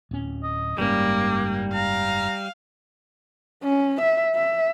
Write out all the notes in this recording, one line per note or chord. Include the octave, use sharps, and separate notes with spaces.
D1 C#4
D#5
F#1 G#2 G3 A#3 C#4 D6
F5 A#5
C#4
E5
E5